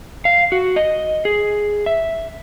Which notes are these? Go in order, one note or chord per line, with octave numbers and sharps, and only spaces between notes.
F5
F#4
D#5
G#4
E5